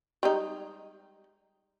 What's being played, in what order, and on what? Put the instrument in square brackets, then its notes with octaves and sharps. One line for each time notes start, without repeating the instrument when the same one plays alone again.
[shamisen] G3 G#3 D#4